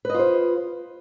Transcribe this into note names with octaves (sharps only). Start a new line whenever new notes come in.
F4 B4 C5 D#5